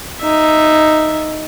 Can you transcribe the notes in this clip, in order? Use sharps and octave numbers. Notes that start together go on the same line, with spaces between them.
D#4 E5